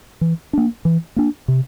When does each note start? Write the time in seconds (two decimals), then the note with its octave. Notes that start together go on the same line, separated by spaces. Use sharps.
0.21 E3
0.53 A#3 D4
0.85 E3
1.16 A#3 D4
1.48 C3